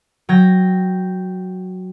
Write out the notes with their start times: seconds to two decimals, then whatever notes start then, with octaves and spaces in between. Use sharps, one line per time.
0.29 F#3 G5 G#6 A#6